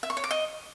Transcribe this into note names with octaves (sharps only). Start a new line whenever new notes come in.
E5
C#6
C#5
D6
D#5